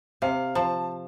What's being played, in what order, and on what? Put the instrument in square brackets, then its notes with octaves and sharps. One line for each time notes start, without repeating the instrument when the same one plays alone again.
[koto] C3 [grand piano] F5
[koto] F3 [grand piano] A5